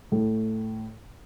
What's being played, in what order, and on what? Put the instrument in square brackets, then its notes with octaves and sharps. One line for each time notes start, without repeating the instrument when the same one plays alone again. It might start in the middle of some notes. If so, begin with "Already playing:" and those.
[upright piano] A2